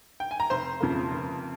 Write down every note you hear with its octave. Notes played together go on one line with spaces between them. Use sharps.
G5
G#5
A#5
F1 C5 C6
F2 C#3 F3 A#3
F1